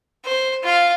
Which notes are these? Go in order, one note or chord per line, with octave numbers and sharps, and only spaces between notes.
C5
F4 F5